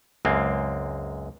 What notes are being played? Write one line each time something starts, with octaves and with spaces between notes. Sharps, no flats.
C#2 F#2 G#3 A#3 C4